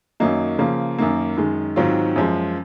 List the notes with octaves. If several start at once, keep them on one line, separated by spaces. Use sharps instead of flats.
F#2 D#3 F#3 A#3 D#4
C#3 F3 A#3
F#2 D#3 A#3
F#2 D#3 G#3
G#2 D#3 F#3 C4 F4
F#2 F3 G#3